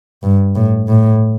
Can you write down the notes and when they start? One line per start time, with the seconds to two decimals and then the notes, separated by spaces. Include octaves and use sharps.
0.23 G2
0.56 A2
0.88 A2